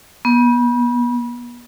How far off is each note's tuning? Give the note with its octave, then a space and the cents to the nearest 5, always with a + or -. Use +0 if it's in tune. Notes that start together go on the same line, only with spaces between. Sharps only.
B3 -30